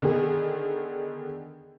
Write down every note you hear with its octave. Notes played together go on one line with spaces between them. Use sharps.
D3 D#3 B3 G#4